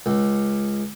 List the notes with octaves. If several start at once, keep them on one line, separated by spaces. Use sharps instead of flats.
C#2